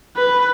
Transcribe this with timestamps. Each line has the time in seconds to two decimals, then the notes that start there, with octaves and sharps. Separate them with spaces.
0.17 B4